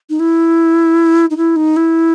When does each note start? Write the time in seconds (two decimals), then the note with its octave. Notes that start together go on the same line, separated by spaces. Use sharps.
0.10 D#4
0.19 E4
1.30 D#4
1.37 E4
1.56 D#4
1.76 E4